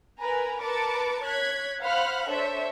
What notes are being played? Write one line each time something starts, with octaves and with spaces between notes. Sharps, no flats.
A#4 B4 G#5 A#5
A#4 B4 A5 D6 A6 C#7
C#5 F#6 G#6 B6
C5 F5 F#5 B5 F6 F#6
D4 A4 C5 C#5 E5